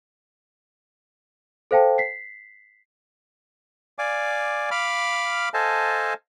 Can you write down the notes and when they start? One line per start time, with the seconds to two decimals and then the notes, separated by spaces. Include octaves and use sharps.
1.71 A4 C5 F5 G5 A5
1.98 B6 C7
3.98 D5 F5 G#5 D6
4.71 F5 B5 D6 F6
5.54 A4 C5 D#5 F5 G#5 A5